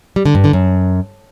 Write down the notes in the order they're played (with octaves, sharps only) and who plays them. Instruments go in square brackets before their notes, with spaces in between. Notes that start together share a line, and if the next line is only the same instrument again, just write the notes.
[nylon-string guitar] G3
D3
G2
D3
F#2